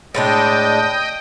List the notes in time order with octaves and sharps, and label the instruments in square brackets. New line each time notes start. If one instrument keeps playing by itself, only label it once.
[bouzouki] A2 G#3 D4 [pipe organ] D#5 G5